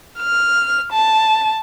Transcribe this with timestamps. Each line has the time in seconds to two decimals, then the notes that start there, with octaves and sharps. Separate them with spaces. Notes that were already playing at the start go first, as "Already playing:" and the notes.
0.20 F6
0.92 A5